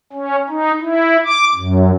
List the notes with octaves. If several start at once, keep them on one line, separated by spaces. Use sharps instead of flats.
C#4
D#4
E4
D6
F#2